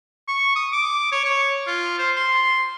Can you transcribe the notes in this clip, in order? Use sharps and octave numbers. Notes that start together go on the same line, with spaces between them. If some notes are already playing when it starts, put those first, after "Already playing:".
C#6
D#6
D6
C#5
C#5
F4
C5
C6